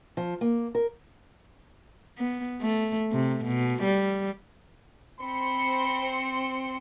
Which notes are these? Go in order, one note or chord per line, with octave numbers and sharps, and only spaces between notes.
F3
A#3
A#4
B3
A3
C3
B2
G3
C4 B5 C6 C#7